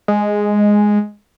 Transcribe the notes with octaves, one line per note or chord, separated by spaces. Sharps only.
G#3